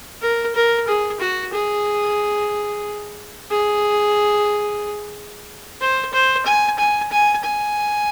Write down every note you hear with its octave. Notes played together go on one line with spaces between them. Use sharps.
A#4
A#4
G#4
F#4
G#4
G#4
C5
C5
G#5
G#5
G#5
G#5